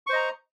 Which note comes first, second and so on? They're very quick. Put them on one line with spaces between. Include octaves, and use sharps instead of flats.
C#6 C5 D#5 A#5